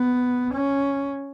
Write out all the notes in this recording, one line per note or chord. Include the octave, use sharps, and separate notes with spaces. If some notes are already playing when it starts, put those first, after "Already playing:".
Already playing: B3
C#4